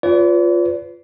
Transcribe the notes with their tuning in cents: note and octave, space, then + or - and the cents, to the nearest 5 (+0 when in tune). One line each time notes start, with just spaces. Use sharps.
F4 +0 B4 +25 D5 -45